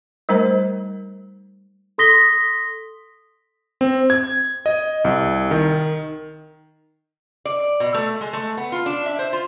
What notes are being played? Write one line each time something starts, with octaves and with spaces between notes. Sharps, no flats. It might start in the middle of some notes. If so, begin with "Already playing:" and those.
G3 A3 D#4 A#4 C5 A#5
A4 C6 D#6 A#6 B6 G7
C4
G#6
D#5
C2
D#3
D5
B2
A3
G#3
A3
B3
F4
D4
E5
C5
F4